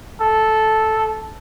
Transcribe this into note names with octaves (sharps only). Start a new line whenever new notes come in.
A4